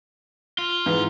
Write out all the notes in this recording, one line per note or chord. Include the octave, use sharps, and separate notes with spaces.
F4
G#2 E3